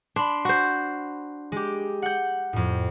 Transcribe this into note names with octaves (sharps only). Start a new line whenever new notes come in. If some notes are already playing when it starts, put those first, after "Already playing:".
D4 B5 C6
F#4 C5
G#3 G4
F#5 G6
F2 A2